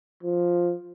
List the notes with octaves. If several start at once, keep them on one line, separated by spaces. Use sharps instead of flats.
F3